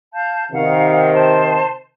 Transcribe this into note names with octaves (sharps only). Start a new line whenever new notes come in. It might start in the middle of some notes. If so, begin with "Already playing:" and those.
F5 A5 G6
C3 D#3 F5 F#5
C5 A5